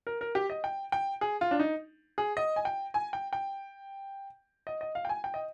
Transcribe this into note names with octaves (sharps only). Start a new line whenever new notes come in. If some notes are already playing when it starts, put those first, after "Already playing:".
A#4
A#4
G4
D#5
G5
G5
G#4
F4
D4
D#4
G#4
D#5
G#5
G5
G#5
G5
G5
D#5
D#5
F5
G5
G#5
G5
D#5